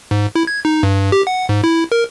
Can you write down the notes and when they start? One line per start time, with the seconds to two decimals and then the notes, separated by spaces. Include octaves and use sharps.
0.11 G#2
0.35 E4
0.47 G#6
0.65 D#4
0.83 G2
1.12 G4
1.27 F#5
1.49 G#2
1.64 E4
1.92 A#4